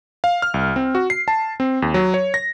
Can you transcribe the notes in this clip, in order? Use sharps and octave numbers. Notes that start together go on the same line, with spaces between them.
F5
F6
C2
C4
F#4
C7
A5
C4
D#2
F#3
C#5
A#6